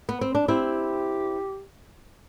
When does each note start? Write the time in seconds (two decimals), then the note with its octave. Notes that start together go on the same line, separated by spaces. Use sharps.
0.09 B3
0.21 C4
0.35 D4
0.48 C4 E4 G4